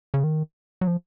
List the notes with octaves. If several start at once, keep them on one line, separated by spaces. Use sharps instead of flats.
C#3
D#3
F#3
F3